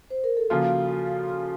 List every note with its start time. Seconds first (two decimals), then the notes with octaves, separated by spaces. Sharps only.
0.10 C5
0.24 A#4
0.37 A4
0.50 C#3 F3 A#3 F4 F#4